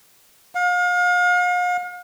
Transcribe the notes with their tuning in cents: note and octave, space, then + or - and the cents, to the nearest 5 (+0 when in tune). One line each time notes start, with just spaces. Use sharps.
F5 +40